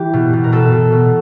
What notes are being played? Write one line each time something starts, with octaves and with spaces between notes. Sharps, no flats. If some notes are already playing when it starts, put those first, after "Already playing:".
Already playing: E3 G4
B2
B2
A#4
B2 A4
B2
B2